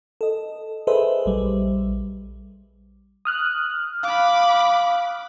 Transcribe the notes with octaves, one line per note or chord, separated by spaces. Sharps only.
A4 D#5
G#4 A4 B4 C5 D#5 E5
A#1 G3
D#6 F6 F#6
F5 B5 D6